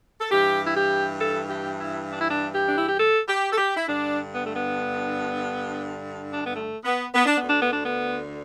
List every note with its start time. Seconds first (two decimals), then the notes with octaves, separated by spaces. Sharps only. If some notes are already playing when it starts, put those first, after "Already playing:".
0.21 A4
0.30 G2 E3 G4
0.67 E4
0.75 G4
1.19 A4
1.50 G4
1.79 E4
2.09 D4
2.19 E4
2.30 D4
2.54 G4
2.67 D4
2.77 E4
2.87 G4
2.98 A4
3.28 G4
3.52 A4
3.58 G4
3.77 E4
3.87 G2 D3 D4
4.32 B3
4.44 A3
4.55 B3
6.33 D4
6.44 B3
6.55 A3
6.85 B3
7.15 B3
7.26 D4
7.38 B3
7.44 D2 D3 D4
7.60 B3
7.72 D4
7.84 B3